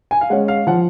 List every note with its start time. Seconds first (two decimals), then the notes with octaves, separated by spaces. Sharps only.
0.11 G#5
0.21 F5
0.30 G#3 C#4 F#5
0.48 F5
0.67 F3 F#5